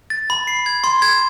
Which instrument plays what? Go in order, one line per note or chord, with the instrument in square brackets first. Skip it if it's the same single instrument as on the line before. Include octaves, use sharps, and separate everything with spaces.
[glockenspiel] A6
B5
C7
G#6
C6
G#6